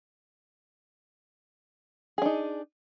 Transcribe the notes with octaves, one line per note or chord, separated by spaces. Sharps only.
D4 D#4 G#4